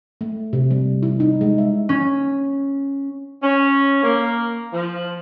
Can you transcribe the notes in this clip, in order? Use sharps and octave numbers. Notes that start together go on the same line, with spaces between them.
A3
C3
G3
E4
D#4
G#3
E5
C#4
C#4
A#3
F3